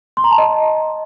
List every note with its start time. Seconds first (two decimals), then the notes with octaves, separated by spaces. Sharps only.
0.17 C6
0.24 A#5
0.31 A5
0.38 D#5